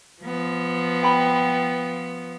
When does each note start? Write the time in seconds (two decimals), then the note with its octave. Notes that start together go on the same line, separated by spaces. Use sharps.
0.23 F3 B3
1.03 G5 B5